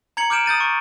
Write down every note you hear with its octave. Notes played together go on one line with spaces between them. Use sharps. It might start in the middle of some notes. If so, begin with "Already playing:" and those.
A#5 G#6 C#7 F#7
D6 F6 G6 D7 E7
D#6 G6 A6 D#7
C#6